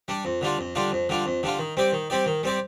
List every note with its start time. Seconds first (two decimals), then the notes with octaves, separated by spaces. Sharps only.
0.08 G3 D4
0.25 F2
0.41 D3 G3 D4 F4
0.59 F2
0.75 D3 G3 D4 F4
0.92 F2
1.09 D3 G3 D4 F4
1.26 F2
1.43 D3 G3 D4 F4
1.59 D#3
1.77 G3 C4 G4 D5
1.93 D#3
2.10 G3 C4 G4 D5
2.26 D#3
2.43 G3 C4 G4 D5